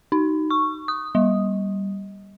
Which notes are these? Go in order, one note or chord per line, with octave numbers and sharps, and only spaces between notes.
D#4
C#6
D#6
G3